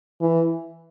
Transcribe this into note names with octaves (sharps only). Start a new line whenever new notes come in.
E3